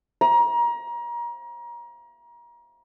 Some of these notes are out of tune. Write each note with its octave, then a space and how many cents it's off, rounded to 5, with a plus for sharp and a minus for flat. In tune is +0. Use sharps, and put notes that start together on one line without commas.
A#5 +30